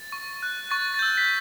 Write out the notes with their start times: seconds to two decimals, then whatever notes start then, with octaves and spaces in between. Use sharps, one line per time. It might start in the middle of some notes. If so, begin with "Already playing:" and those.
Already playing: A6
0.12 C#6
0.43 F#6
0.71 C#6 A6
0.94 A6
0.99 E6 G6
1.18 B6